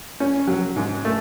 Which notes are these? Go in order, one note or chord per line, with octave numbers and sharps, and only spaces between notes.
C#4
F#3
G#2
A3